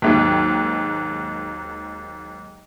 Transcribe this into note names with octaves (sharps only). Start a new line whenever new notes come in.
D#2 G#2 F#3